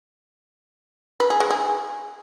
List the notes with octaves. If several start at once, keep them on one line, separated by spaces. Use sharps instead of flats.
B4
G#4
G#3
G#4